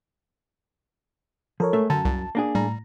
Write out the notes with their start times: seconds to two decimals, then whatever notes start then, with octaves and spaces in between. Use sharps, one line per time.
1.60 F3 A4 A#4 C#5
1.73 G#3 A3 E5
1.90 F#2 D3 A5
2.05 C2
2.35 A#3 D4 G#4
2.55 A2 G3 A#5